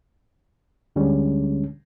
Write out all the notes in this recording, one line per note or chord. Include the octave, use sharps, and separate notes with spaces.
D2 D3 G3 G#3 C#4